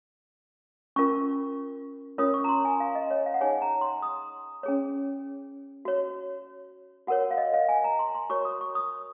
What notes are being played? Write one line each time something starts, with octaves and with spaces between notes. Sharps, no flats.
C#4 F4 A#4 C#6
C#4 F4 A#4 C#5 D#6
C#6
A#5
C6
G#5
F5
D#5
C#5
F5
F#5
D#4 G#4 C#5 G#5
A#5
C6
D#6
C#4 G#4 C#5
F#4 C#5
F#4 A#4 C#5 F#5
F5
D#5
F5
G#5
A#5
C6
C6
F#4 A#4 C#5 C#6
D#6
C#6
D#6